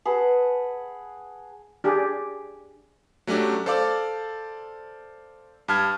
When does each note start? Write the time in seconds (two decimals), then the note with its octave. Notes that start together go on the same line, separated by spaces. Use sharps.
0.05 G#4 B4 F#5 A5
1.84 D4 G4 G#4
3.27 F#3 A3 C#4 D4 G4
3.66 A4 C5 D5 F5 D6
5.68 G2 A5 F6 G#6